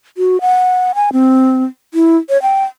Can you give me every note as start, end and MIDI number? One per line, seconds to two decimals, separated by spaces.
0.17 0.41 66
0.41 0.92 78
0.95 1.12 80
1.13 1.64 60
1.94 2.17 64
2.29 2.41 73
2.42 2.64 79